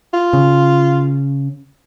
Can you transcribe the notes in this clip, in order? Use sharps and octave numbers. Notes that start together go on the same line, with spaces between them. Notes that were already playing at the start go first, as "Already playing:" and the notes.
F4
C#3